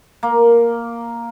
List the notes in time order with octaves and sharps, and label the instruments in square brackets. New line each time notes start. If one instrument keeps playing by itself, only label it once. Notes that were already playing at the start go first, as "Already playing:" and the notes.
[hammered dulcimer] A#3